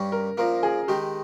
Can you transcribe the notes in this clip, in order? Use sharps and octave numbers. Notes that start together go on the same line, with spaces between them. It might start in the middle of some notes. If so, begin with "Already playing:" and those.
Already playing: G2 G3 C#4
A#4
A#2 F3 A#3 A#4
G#4
D#3 G#3 D#4 G4